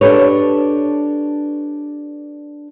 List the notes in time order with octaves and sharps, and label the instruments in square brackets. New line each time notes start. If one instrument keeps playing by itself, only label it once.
[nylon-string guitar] D4 G4 A4 B4 C#5